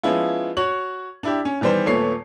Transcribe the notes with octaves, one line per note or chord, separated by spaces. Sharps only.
F3 G#3 B3 C#4 E4 F4
F#4 C#5 C#6 F#7
D4 E4 G4
C#4
D#3 E3 G3 B3 C5
D#1 A#2 A3 B3 C#5 C7